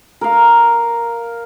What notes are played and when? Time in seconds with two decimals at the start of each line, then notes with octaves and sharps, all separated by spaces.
0.21 A#4 F5